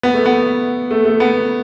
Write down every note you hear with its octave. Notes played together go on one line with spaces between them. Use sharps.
B3
A3
B3
A3
A3
B3